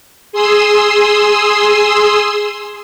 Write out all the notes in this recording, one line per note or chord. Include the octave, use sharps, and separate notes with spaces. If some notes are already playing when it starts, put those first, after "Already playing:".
G#4 C6 D#6 E6